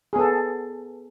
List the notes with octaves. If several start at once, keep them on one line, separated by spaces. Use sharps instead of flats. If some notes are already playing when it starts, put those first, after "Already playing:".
B3 G#4 A4